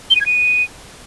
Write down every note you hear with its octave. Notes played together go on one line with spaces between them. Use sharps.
G7
D#7
G#6
D#7